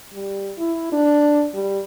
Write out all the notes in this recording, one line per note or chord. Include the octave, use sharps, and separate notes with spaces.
G3
E4
D4
G3